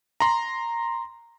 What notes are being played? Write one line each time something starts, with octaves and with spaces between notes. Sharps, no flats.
A#5 C6